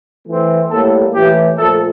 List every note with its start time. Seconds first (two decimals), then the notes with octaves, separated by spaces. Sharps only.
0.25 E3 A3 C4
0.70 A2 G3 A#3 A4
1.13 A2 E3 A3 G4
1.57 A#2 F3 A3 A4